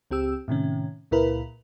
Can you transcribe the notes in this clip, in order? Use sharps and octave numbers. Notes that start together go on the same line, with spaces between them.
C#2 C4 G4 E6
A2 C3 D#3 C#4
C#2 A#2 E4 A#4 B4